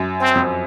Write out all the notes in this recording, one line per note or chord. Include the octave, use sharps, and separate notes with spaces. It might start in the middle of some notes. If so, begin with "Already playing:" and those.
Already playing: F#2
C4
F2